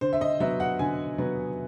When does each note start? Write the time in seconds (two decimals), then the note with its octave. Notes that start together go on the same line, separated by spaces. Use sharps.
0.01 D3 C5
0.13 E5
0.21 D#5
0.40 F#3 B3 E5
0.60 F#5
0.79 D3 G#5
1.18 F#3 B3